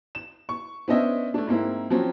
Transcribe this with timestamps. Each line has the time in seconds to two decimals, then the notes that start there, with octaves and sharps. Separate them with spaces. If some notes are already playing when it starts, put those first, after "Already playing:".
0.15 E7
0.49 C#6
0.88 B3 C#4 D4 C5 D#5 E5
1.34 A3 D4
1.47 G#2 A#3 C4 E4
1.90 F3 F#3 C4 C#4